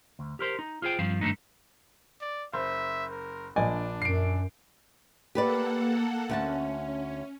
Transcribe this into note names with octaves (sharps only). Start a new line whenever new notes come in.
D2
G4 A#4 C5
D#4
F4 G#4 C5 G5
G2 F3 C4 F5
G2 D#3 F#3 A3 D4 D#4
D5
F#1 C5 E5
A#4
A#1 D4 D5 D#5 G#5
F#2 C7 D7
A#3 G4 A4 B4 D5 F#5
D2 C#4 F#5 A5